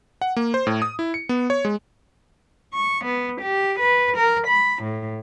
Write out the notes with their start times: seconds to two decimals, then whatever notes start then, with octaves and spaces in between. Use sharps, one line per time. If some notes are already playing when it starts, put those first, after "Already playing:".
0.22 F#5
0.36 A#3
0.54 C5
0.67 A2
0.82 D#6
0.99 E4
1.14 C#7
1.29 B3
1.50 C#5
1.65 G#3
2.75 C#6
3.05 B3
3.42 G4
3.80 B4
4.17 A#4
4.47 B5
4.83 A2